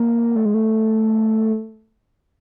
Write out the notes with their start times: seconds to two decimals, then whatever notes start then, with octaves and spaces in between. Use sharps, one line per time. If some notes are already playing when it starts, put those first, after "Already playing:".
Already playing: A#3
0.36 A3
0.45 G#3
0.54 A3